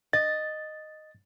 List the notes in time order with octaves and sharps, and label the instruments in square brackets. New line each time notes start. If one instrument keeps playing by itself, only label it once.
[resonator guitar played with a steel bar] D#5 [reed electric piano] A6